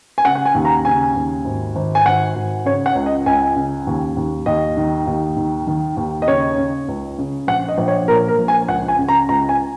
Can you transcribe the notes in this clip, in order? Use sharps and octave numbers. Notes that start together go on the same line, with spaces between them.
G#5
C#3 F#5
F#5
G#5
D#2
A#5
C#3 G#5
D#2
G#1
G#1
G#5
G#1 F#5
G#1
C#3 C#5
F#5
C#2
D#5
C#2 G#5
C#3
D#2
D#2
D#2 D#5
D#3
D#2
D#3
D#3
D#2
D#5
C#3 C#5
C#3
C#2
C#3
A#1 F#5
D#5
A#1
C#5
A#2 A#4
A#4
A#1
G#5
C#2 F#5
G#5
C#3
A#5
C#2 A#5
G#5